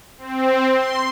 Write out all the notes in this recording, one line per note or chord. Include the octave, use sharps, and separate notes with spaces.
C4
C6